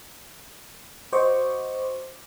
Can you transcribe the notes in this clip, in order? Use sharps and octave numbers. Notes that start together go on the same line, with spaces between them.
F#4 C5 D#5 C#6 D6